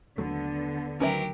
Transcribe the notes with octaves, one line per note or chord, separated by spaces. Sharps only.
D#2 D3 F#3 A3 B3
D2 D#3 F#3 C#4 G4 A#4 B4 E5